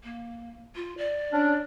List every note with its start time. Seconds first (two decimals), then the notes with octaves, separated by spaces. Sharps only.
0.04 A#3
0.76 F4
0.98 D5
1.33 C#4 D4